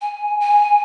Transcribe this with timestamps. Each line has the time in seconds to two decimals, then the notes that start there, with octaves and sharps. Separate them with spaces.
0.01 G#5
0.40 G#5